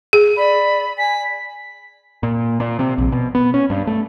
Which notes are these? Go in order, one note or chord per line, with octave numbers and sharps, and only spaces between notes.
G#4
D5 B5
G#5 B6
A#2
A#2
C3
A#1
B2
B3
C#4
G2
A3